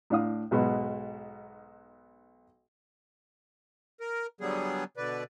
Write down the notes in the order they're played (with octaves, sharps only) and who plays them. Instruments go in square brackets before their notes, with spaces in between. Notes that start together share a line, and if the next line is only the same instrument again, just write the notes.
[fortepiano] A2 D4 F5 D#6
B1 G#2 B2 F#5 B5
[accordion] A#4
D3 F#3 G3 B3 G#4
B2 D3 B4 D5